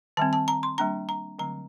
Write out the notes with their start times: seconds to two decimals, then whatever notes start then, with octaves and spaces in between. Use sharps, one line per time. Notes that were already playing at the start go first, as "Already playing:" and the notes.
0.17 D#3 G3 C4 A5
0.33 A5
0.48 A#5
0.63 C6
0.78 G3 A#3 D4 A#5
1.09 A#5
1.39 D3 F#3 A3 C4 A#5